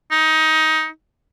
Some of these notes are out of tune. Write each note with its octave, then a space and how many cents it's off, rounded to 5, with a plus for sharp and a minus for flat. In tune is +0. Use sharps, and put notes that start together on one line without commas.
D#4 +20